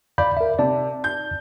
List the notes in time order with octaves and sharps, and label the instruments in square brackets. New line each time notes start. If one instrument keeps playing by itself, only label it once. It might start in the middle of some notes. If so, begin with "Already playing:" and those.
[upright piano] D5 [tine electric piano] F5 B5 G6
[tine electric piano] A#4 E5
[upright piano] C3 [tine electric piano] D5 A5
[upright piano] G6